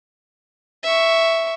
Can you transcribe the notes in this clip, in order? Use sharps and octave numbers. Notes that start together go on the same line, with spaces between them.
E5 C#6